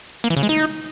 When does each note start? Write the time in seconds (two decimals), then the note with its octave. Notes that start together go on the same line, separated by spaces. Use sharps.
0.24 A#3
0.30 E3
0.37 C#3
0.43 G#3
0.49 D#4